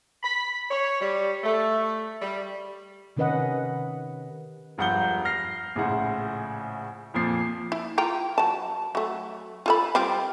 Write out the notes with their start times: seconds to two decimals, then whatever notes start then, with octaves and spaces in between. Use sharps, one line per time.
0.23 B5
0.71 C#5
1.01 G3
1.44 A3
2.22 G3
3.17 C3 D#3 C#4 B4 D#5 F#5
4.78 E1 G2 F3 F#5 G6 G7
5.25 F6 A#6 C7
5.76 A#1 A2 C#3 E4 F#5 C6
7.14 F2 A#2 F3 C7
7.72 E4
7.98 F4 G5 A#5
8.38 F#3 A5
8.95 F#3 A3
9.66 F4 A4 B5
9.95 G3 C4 F4